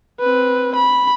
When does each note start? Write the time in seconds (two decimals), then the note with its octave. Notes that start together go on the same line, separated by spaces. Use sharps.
0.20 C4 B4
0.75 B5